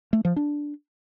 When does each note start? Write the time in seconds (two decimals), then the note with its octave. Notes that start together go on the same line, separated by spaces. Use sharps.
0.13 A3
0.25 F3
0.36 D4